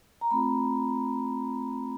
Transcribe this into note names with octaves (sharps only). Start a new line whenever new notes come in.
A#5
A3 C4 F4 B5